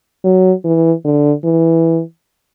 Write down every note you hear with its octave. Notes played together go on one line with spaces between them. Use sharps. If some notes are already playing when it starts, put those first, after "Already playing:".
F#3
E3
D3
E3